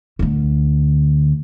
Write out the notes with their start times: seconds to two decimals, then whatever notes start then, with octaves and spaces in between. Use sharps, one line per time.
0.19 D2 D3